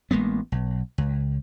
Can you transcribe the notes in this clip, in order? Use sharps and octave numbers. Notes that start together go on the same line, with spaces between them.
A1 G#3 A#3 B3
B1
C#2